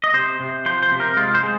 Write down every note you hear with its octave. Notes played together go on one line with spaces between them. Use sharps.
D#5
C3 C5
C3
F3 C5
C5
C3
A#4
G#3 F4
C5
G#3